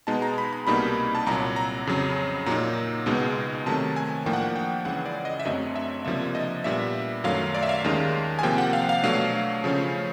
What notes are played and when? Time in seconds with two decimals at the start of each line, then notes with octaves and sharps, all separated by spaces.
0.07 B2 G#3 B3 D#4 A5
0.22 A#5
0.38 B5
0.53 B5
0.67 C2 B2 G3 A#3 D#4 B5
1.15 A5
1.26 C2 A#2 F#3 A#5
1.56 A#5
1.87 F2 C#3 F#3
2.46 A#2 F#3 A#3 D#4 A#5
3.06 C#2 B2 G#3 B3 D#4
3.66 C3 D#3 F#3 A3 A5
3.96 G#5
4.26 A2 F3 A#3 D4 G5
4.33 F#5
4.43 G5
4.56 G5
4.85 C#2 C#3 E3 F#5
5.06 D5
5.25 D#5
5.40 E5
5.45 F#2 D3 F#3 A3 C4 D#5
5.76 E5
6.05 C#2 C3 F3 A#3 D4 E5
6.35 D#5
6.64 A#2 G3 B3 D4 E5
7.24 F#2 D#3 F#3 A3 F5
7.54 D5
7.63 E5
7.69 F5
7.84 D#2 D#3 G#3 C#4
8.39 G#5
8.43 C3 F3 A#3 G5
8.58 F#5
8.73 F5
8.89 F5
9.03 B2 F#3 A3 D4 F5
9.64 C#3 F3 A3 C#4